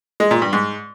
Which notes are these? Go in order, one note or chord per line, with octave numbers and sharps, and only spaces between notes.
G#3
A#2
G2
G#2